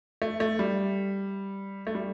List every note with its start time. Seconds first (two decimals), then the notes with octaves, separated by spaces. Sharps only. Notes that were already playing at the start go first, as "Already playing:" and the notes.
0.22 A3
0.40 A3
0.59 G3
1.87 A3
1.95 G3